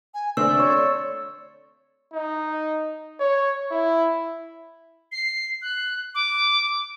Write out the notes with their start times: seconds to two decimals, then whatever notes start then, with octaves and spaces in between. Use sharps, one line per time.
0.14 G#5
0.37 D3 A3 C4 D5 E6
0.59 C#5
2.13 D#4
3.20 C#5
3.71 E4
5.12 C7
5.62 F#6
6.15 D6